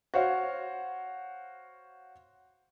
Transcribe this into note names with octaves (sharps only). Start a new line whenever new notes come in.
F#4 C5 C#5 F5